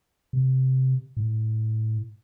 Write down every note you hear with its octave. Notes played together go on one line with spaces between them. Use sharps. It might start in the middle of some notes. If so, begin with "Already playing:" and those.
C3
A2